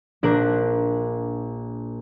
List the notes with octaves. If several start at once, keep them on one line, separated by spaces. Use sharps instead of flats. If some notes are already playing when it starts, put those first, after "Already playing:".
A#1 D4 A#4 F#6